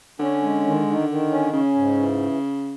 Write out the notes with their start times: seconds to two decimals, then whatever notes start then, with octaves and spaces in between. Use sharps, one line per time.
0.19 D3 C#4
0.43 G#3
0.64 D#3
0.86 D#3
1.09 D#3
1.30 C#4
1.53 C#3 C#4
1.75 G#2
1.97 E3